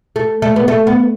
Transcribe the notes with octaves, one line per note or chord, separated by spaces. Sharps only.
A3
A3
B3
A3
B3